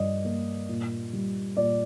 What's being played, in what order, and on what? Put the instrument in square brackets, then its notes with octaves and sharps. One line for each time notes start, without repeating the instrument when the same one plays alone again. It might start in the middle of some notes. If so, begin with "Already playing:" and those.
Already playing: [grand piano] G2 F3 D5 D#5
A#3
A#2
G3
A#2 D5